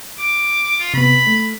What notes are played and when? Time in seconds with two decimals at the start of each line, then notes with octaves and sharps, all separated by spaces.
0.19 D6
0.80 F4
0.94 C3 B3 B5
1.27 A3